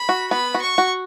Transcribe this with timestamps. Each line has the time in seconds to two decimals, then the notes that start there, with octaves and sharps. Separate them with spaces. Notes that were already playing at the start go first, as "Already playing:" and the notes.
Already playing: B5
0.09 F#4
0.31 B3 B5
0.54 F#4
0.62 C#6
0.78 F#4